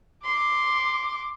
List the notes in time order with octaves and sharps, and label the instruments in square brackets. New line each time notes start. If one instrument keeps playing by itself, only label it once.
[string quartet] C6 [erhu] D6